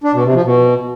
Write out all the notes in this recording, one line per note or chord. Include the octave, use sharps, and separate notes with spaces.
D4
B2
C3
F3
B2